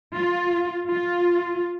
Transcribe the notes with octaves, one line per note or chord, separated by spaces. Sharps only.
F4
F4